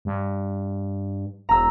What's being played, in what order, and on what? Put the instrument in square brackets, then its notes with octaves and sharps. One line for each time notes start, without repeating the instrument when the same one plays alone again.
[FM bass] G2
[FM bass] E1 [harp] A#5 E6